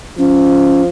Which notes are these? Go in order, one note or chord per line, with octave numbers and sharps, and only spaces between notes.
F3 C#4